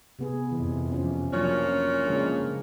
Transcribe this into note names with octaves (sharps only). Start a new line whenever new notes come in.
C3 B3 G#4
F2 C3 E3
F3 C#4
A#2 F3 F#3 D4 C#5
C#4
C#3 F3 G#3 A#3 D4